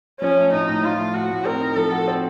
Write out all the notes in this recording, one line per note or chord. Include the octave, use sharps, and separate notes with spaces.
F3 C#4
A3
A2 D#4
A2
F3 F4
A3
A2 F#4
A2
C4 A#4
D#4
F3 A4
F#4
C4